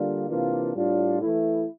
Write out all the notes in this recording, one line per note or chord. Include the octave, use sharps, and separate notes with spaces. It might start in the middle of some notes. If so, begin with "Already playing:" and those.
Already playing: D3 G3 A#3 D4 F4
C3 E3 A#3 D4 F4
A2 G3 D4 F4
E3 A3 E4